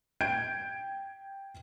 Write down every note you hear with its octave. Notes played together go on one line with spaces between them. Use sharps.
G5 G6 G#6 D7